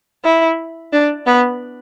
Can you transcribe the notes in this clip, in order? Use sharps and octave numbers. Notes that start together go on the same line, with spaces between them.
E4
D4
B3